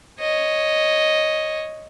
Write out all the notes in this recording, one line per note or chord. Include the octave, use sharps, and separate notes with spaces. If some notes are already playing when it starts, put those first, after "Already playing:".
C#5 D#5